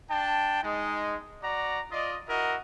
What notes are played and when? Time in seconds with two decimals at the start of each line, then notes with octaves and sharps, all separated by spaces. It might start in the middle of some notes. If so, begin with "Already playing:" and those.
0.11 D4 G5 A5
0.63 G#3 D#4
1.42 F#4 D5 F#5 A#5
1.92 F4 D5 D#5
2.29 E4 F#4 A#4 D#5